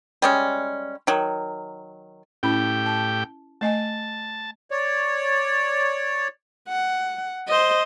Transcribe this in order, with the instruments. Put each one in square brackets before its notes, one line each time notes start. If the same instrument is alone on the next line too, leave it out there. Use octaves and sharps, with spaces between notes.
[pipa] G3 G#3 C#4
D#3 F#3
[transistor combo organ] A2 G4 G5 [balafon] C#4 E4 B5
[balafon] A5
[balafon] A3 D#5 G#5 [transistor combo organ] A5
[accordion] C#5 D5
[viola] F#5
C5 D#5